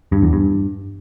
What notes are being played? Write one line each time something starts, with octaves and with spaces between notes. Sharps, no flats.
G2
E2
G2